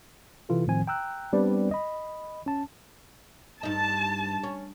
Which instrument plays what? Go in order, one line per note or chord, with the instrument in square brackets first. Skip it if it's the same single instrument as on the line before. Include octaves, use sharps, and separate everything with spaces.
[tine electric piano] C3 E3 F4 A4
A2 D#3 F3 C4 G#5
G5 A#5 E6 F#6
G3 B3 C4 D4 B4 D5
D#5 B5
C#4 A5
[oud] G2 D#4 [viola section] A5
[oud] C#4